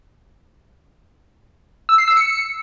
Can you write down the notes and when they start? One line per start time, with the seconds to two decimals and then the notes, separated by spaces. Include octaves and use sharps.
1.89 E6
1.98 C7
2.08 E6
2.17 C#7